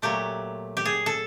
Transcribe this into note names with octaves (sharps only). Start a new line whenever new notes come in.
A#2 F#3 A3 G4
G4
G#4
A4